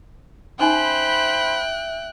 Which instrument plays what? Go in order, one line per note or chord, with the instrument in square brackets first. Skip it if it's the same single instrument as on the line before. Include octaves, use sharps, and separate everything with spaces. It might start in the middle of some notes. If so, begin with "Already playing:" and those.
[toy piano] C#4 D#4 G#5 [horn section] C5 B5 [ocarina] E5 [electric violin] G5 F#6